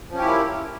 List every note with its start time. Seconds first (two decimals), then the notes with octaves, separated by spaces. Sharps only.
0.10 F3
0.14 C#4
0.18 G4
0.22 E4
0.26 A#3